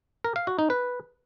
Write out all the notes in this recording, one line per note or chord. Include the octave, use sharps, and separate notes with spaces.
A#4
F5
F#4
D#4
B4